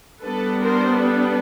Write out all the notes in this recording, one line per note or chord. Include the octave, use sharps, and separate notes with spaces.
G3 B3 D4 A4 B4
A#4 C5
A4 B4